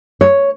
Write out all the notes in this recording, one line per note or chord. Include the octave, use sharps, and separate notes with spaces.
C#5